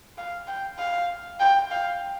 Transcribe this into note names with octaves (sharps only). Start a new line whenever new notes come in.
F5
G5
F5
G5
F5